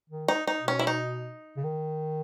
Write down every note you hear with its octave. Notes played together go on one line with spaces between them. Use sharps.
D#3
D#4
D#4
B2
C#4
E4
D#4
C#3
D#3